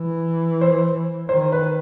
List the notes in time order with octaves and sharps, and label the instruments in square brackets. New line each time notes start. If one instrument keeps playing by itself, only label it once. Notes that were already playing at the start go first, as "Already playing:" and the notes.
Already playing: [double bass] E3
[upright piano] C5
[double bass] D#3 [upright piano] C5
[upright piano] B4